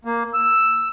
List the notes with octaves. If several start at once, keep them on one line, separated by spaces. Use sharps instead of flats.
A#3
E6